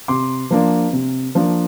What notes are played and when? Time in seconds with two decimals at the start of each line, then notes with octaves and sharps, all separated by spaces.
0.08 C3 C6 D6
0.51 F3 A#3 D4
0.93 C3
1.35 F3 A#3 D4